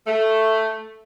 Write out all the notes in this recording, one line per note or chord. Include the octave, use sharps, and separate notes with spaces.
A3